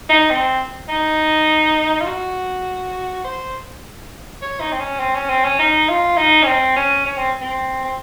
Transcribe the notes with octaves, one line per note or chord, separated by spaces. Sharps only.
D#4
C4
D#4
F4
F#4
C5
C#5
D#4
C4
C#4
C4
C#4
C4
C#4
D#4
F4
D#4
C#4
C4
C#4
C#4
C4
C4
C4